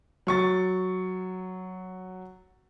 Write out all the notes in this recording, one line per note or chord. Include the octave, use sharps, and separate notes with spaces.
F#3 C#6 A6